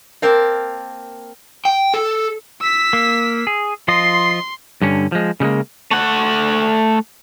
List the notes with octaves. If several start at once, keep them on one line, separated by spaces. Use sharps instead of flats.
A#3 C4 A#4 A5
G5
A4
E6 B6
A#3
G#4
F3 F4 D#5 C6
G2 D3 C#4
F3 G#3
C#3 G3 G#3 A#3
A3 F#5